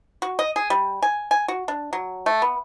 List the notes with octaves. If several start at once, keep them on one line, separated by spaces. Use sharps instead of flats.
F#4
D#5
G#4
G3
G#5
G#5
F#4
D4
F#3
A3
B3